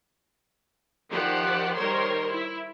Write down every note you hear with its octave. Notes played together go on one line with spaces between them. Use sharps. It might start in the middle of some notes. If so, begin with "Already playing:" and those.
D#3 F3 G4 C5 D5 F#5
D#3 G3 A#4 C5 C#5 C6
E4